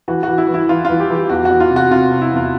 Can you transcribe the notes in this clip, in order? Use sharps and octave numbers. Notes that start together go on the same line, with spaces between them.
E3 F#4
E3 F#4
E4
E3
E4
E3 F4
E3 F4
G4
E3 G4
E2 F#4
F#4
E2
F4
C3
F#4
C3 F4
C3
E4
E2 F4